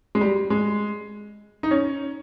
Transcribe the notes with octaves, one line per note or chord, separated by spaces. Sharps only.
G#3
G3
G#3
D#4
C#4